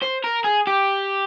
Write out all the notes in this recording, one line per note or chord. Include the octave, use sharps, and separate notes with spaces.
C5
A#4
G#4
G4